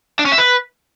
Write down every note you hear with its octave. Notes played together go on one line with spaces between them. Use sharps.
D4
C#4
E5
B4